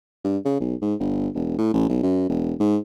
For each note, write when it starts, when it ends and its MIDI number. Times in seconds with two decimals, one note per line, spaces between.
0.24 0.37 43
0.45 0.59 49
0.60 0.74 35
0.81 0.94 44
1.00 1.28 31
1.34 1.55 28
1.58 1.73 45
1.74 1.88 33
1.89 1.98 35
2.03 2.24 42
2.29 2.54 28
2.60 2.77 44